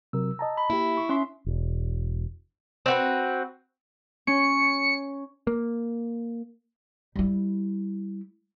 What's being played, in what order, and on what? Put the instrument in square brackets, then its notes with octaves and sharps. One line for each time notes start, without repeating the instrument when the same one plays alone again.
[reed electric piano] C3 F#3 A#4 [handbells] E6
[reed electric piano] D#5 A5 A#5
[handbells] B5
[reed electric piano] A#3 G4 [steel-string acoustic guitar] E4
[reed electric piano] C#6
[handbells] C#4 E5 C6
[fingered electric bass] E1
[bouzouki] C4 F#4 B4
[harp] C#4 [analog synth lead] C#7
[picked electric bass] A#3
[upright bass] G3 E4